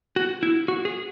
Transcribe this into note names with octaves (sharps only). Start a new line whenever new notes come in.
F#4
E4
F#4
G#4